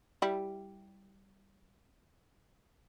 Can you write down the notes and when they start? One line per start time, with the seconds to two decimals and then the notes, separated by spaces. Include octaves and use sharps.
0.22 G3 E4